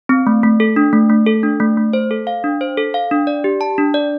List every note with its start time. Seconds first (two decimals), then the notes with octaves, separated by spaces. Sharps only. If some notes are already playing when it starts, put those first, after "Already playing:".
0.09 C4
0.27 A3
0.43 A3
0.60 A4
0.76 D4
0.93 A3
1.10 A3
1.26 A4
1.43 D4
1.60 A3
1.77 A3
1.93 C5
2.11 A4
2.27 F5
2.44 D4
2.61 C5
2.77 A4
2.94 F5
3.11 D4
3.27 D5
3.44 G4
3.61 A5
3.78 D4
3.94 D5